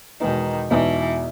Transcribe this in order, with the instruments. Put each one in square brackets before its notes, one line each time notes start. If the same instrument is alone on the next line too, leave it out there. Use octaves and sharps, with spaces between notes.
[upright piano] E2 B2 G#3 B3 D#4 [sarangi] D#3
[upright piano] E2 B2 G#3 B3 D#4 [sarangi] E3